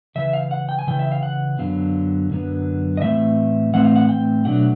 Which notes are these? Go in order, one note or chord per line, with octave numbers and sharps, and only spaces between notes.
C#3 E3 E5
F5
F#5
G5
G#5
C#3 E3 G5
E5
F5
F#5
F#2 D3 F#3 B3 F5
F#2 D3 F#3 B3
D#5
A2 E3 A3 C4 E5
A2 E3 A3 C4 F#5
F5
F#5
G5
B2 F#3 A3 D4 F#5